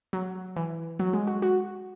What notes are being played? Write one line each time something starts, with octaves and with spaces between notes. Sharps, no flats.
F#3
E3
F#3
G#3
F#4
F#4